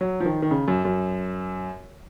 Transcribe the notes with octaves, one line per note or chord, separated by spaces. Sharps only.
F#3
F3
D#3
D#3
C#3
F#2
F#2